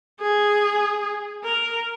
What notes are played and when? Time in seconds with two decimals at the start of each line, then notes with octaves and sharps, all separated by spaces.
0.21 G#4
1.44 A#4